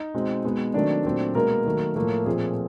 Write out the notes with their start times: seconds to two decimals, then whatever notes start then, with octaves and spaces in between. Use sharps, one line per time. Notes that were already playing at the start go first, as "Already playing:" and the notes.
Already playing: D#4 D#5
0.14 B2 G#3 C4
0.45 B2 G#3 B3
0.74 D#3 F#3 A3 C4 D4 D5
1.05 A#2 F#3 A3 C4
1.35 B2 G#3 A#3 B3 A#4
1.66 D#3 F#3 A3
1.95 A2 F3 A3 A#3 A#4
2.26 A#2 F3 A3 C4 G#4